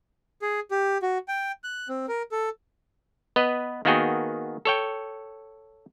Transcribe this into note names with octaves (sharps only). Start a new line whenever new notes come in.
G#4
G4
F#4
G5
F#6
C4
A#4
A4
B3 B4 D#5
D#3 A#3 B3 F#4 G#4 G5
A4 C#5 G5